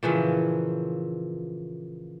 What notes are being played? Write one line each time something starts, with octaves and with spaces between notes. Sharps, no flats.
A#2 C#3 E3 F3